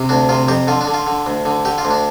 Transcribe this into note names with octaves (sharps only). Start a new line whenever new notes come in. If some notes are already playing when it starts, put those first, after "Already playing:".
Already playing: C3
D2 D4
C3 F4
F2 G4
D3 F4
D4
D3
F4
D3
D2
D3
D3 G4
F4
D2
D4